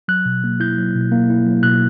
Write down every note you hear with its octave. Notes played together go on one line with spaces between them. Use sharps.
F#3 F#6
B2
A#3
E4 G6
F#3
B2
A#3
E4
F#3
B2 F#6